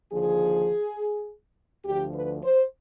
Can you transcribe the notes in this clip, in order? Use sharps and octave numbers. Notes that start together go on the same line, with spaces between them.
D#2 D3 F3 G#4
D2 D3 F3 G4
B4
C5